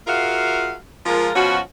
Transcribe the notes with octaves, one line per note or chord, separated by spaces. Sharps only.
F4 F#4 G#4 A#4 E5 F5
F3 G#3 F4 A#4
B2 F3 C#4 F#4